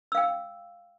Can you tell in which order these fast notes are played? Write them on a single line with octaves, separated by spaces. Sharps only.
E6 F5 G5